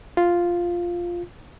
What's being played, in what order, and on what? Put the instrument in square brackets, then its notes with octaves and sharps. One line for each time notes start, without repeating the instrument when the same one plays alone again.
[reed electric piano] F4